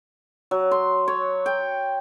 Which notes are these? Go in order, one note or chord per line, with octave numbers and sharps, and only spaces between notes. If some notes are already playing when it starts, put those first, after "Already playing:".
F#3
C6
C#5
G5